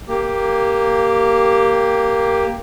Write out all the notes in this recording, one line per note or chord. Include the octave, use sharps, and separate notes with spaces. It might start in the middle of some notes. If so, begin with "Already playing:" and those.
A#3 G4